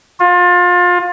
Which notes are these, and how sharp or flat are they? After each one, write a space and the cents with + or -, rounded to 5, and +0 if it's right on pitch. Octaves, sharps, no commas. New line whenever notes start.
F4 +30